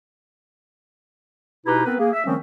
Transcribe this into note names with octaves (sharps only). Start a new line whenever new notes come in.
B2 D#4 E4 G4 B4
B3 C4 A#4 B4
A#3 G#4
E5
D#3 F3 G3 A3 C4 C#4